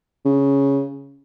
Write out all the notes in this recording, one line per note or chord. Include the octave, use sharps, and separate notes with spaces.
C#3